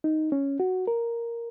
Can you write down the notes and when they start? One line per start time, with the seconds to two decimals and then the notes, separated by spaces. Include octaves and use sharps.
0.04 D#4
0.32 C#4
0.60 F#4
0.87 A#4